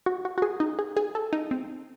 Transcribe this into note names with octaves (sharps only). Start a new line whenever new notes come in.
F#4
F#4
F#4
G#4
D#4
G#4
G#4
A4
D#4
C4